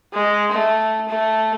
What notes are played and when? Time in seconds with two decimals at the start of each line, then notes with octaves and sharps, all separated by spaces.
0.13 G#3
0.52 A3
1.08 A3